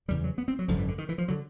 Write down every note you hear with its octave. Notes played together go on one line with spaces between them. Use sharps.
F1 E2 C#3 G3
F#3
B3
C4
F#3
G#1 F#2 D3 F3
E3
D3
D#3
E3
F3
D3 F#3